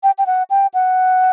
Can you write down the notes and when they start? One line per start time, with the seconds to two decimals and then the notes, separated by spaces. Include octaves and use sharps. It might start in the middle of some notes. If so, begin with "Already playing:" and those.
0.03 G5
0.18 G5
0.27 F#5
0.50 G5
0.74 F#5